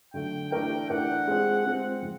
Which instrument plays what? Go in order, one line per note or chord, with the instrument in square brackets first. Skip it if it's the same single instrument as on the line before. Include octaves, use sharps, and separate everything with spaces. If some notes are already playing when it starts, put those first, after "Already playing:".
[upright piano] D3 F#3 A3 [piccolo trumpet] G5
[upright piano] E3 A3 D4 G4 A#4 [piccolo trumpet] G5
[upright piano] E3 A3 D4 G4 A#4 [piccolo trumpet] F#5
[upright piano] G#3 C4 F4 G#4 C5
G#3 C4 F4 G#4 C5
F3